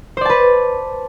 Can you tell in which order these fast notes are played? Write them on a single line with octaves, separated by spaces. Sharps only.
C5 D5 A5 B4